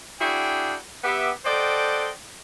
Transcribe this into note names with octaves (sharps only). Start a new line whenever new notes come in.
D4 E4 F#4 G#4 G5
B3 G4 E5
A4 C5 D5 D#5 F#5 G5